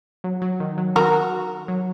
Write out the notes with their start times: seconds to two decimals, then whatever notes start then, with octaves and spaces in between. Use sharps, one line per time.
0.24 F#3
0.42 F#3
0.60 D#3
0.78 F#3
0.96 D#3 F#4 A#4
1.68 F#3